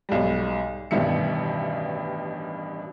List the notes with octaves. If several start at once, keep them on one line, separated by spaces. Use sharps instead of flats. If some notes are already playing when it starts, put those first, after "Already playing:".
B1 G#2 G3
A1 G2 B2 D#3 E5 C#7